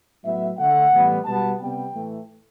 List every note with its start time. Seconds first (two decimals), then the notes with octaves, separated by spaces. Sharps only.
0.24 A2 F#3 B3 E5
0.58 D3 A3 F#5
0.92 A2 E3 G3 B3
1.25 B2 G3 B3 A5
1.59 C3 G3 B3 G5
1.93 A2 E3 A3